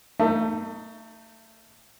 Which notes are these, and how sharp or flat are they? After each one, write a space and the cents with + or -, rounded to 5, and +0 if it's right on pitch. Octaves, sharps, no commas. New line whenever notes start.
A3 +30 D#4 +0 E5 +0